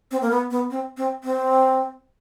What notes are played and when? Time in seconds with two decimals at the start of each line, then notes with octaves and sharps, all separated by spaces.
0.11 C4
0.21 A#3
0.31 B3
0.51 B3
0.70 C4
0.97 C4
1.24 C4